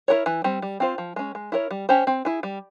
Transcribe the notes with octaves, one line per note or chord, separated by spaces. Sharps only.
E4 A#4 C#5
E3
G3 C4
G3
C4 F4 C5
F3
G#3 C#4
G#3
E4 A#4 C#5
G3
C#4 G4 C5
C4
E4 G#4
G3